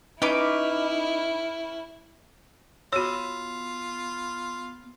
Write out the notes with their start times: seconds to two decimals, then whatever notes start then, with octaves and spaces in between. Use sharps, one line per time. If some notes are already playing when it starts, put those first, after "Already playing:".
0.22 C#4 D#4 E4 B4 D6
2.93 B3 F4 F#4 C#5 B5 E6